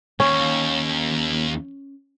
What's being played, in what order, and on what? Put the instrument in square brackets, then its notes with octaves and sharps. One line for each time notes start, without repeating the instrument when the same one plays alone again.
[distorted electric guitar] D#2 [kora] C#4